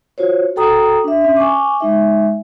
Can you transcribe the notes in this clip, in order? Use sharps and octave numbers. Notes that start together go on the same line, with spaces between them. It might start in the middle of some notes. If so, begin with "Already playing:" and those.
F4 F#4 C5 C#5
F#4 A4 G5 A#5 D#6
D4 E5
C#4 E5
G#5 C#6 D6
G#3 D#4 E5